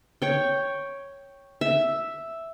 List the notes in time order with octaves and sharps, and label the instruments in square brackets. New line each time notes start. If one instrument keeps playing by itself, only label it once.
[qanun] C#5 G5
E5